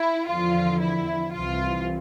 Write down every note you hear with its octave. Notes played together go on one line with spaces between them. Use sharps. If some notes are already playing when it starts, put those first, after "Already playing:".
Already playing: E4
E2 D3 F3 F4
E4
C2 C3 E3 F4